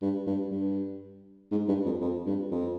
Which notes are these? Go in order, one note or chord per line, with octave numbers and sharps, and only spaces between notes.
G2
G2
G2
G#2
G2
F2
F2
G2
F2